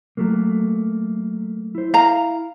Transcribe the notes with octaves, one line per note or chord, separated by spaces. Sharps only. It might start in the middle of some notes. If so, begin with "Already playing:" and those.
F#3 A3 A#3
E4 C5
E4 F5 A#5